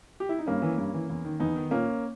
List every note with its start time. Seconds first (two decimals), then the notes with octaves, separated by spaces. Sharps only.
0.20 G4
0.29 E4
0.39 D#4
0.46 G2 A#3 C#4
0.62 E3
0.78 G2
0.94 E3
1.10 E2
1.24 D#3
1.40 E2 B3 D#4
1.56 D#3
1.71 A#2 A#3 C#4